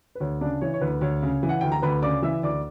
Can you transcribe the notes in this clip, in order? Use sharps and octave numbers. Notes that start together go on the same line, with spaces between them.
B4
D2 C#5
C#3 D4 D5
E3 C#5
C#5
D2 B4
D2 C#5
C#3
E3
F#5
D2 G5
A#5
D2 B4 B5
C#3 D5 D6
E3 E5 E6
D2 D5 D6